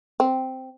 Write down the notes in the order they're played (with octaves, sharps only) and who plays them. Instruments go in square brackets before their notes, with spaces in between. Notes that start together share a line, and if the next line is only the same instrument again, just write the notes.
[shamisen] C4